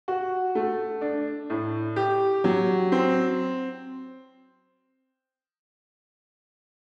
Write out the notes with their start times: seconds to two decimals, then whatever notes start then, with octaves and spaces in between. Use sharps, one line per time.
0.08 F#4
0.55 A3
1.01 D4
1.50 A2
1.96 G4
2.44 F#3
2.92 C4